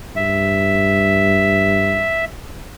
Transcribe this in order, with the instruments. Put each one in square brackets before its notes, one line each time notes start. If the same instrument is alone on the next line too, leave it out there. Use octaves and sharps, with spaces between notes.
[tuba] G2 [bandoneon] E5